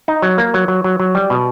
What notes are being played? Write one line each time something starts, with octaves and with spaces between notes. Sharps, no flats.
D#4
F#3
A#3
F#3
F#3
F#3
F#3
G3
B2